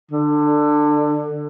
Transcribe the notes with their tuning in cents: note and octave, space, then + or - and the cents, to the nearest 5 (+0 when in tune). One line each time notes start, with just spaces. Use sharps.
D3 +20